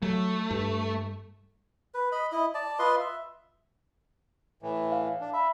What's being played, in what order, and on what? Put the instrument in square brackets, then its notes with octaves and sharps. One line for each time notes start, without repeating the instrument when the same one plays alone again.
[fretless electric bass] F#3 [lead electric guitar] A3
[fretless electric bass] G2
[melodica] B4
D#5 B5
E4 D#5
D5 A5
F4 B4 D#5 C6
E5
[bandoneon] A2 E3
[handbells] F5
[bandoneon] D4
[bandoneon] E5 [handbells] B5